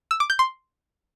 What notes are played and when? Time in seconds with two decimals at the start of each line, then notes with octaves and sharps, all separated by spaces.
0.11 E6
0.20 D6
0.30 G6
0.39 C6